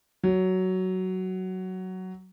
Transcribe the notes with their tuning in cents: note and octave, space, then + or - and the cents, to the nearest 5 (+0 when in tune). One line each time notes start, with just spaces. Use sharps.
F#3 +10